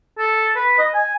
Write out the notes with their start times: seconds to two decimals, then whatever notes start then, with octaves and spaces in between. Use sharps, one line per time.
0.19 A4
0.56 B4
0.78 D#5
0.94 G#5